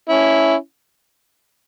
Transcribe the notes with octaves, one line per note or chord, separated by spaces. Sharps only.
C#4 E4